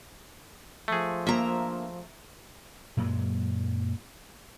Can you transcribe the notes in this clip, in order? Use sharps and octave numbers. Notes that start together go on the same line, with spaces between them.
F3 A3 G#4
A#3 D4 A#4 E5 A#5
F#2 A#2 F#3 G#3